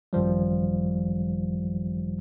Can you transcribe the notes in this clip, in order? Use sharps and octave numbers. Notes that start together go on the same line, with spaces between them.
G#1 F#2 D#3 F3 G3